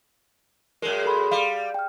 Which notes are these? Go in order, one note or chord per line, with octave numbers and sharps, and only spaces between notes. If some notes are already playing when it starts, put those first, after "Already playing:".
F#2 G#3 A#4
A4 B5 C6
G3 F5
G5 F6